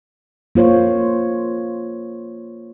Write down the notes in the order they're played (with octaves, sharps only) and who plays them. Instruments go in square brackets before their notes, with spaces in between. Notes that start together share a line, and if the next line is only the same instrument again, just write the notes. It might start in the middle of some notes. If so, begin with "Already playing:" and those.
[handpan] A#3 F4 C5 C#5